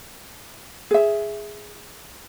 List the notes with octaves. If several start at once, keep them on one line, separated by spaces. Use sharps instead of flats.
G#4 E5